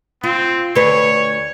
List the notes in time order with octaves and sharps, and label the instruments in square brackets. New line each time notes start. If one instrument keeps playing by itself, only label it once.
[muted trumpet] C4 [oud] F4
[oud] D2 B4 [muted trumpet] C#5